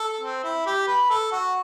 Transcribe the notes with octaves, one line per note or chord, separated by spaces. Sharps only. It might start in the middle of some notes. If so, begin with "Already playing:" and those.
Already playing: A4
C4
E4
G4
B4
A4
F#4